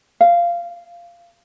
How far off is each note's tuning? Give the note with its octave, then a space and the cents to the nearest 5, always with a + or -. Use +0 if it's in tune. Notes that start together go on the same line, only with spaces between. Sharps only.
F5 -15